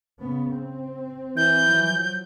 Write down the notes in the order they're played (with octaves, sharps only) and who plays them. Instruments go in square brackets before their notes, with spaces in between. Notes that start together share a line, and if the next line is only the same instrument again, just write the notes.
[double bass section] C#3 B3
C4
[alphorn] E3 [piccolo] G6
[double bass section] F3 F#3